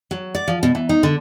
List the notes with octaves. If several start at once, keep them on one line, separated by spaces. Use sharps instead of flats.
F#3
D5
F3
B2
E3
D#4
D3